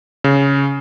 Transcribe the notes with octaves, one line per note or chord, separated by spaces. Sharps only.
C#3